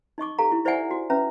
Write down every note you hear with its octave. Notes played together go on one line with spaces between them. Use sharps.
D#4 D#5 C#6 D6
G4 A4 F5 A#5
E4
E4 C5 D5 E5 F#5 G#5
F#4
C#4 B4 E5 A#5